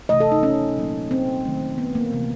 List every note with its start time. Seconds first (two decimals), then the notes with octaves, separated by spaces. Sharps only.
0.09 C3 E3 A3 D#5
0.20 A4
0.32 D#4
0.43 C#4
0.77 A#2 F#3 A#3
1.11 C4
1.45 D#3 F#3 A3
1.78 B3
1.95 A#3
2.12 C3 E3 A3